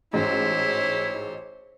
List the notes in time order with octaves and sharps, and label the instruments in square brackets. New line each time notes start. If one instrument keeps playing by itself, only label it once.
[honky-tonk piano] A1 G#2 F#4 [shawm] E4 [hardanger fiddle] C5 C#5